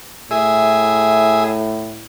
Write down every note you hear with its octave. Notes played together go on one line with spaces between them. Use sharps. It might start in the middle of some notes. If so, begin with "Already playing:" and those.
A2 G#4 E5